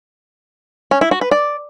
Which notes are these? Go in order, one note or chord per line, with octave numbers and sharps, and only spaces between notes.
C#4
E4
F#4
B4
D5